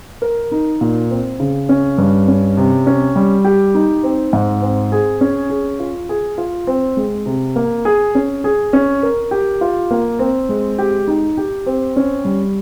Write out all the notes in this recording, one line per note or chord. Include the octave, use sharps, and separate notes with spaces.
A#4
D#4
A#2
C4
C#3
C#4
G2
C#4
C3
C#4
G3
G4
D#4
C4
G#2
C4
G#4
C#4
G#4
F4
G#4
F4
C4
G#3
C3
A#3
G#4
C#4
G#4
C#4
A#4
G4
F4
A#3
C4
G#3
G4
D#4
G4
C4
C#4
G3